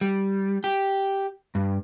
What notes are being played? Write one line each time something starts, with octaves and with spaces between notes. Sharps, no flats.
G3
G4
G2